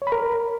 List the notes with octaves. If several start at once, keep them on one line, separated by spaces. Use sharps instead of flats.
C#5
B5
A#4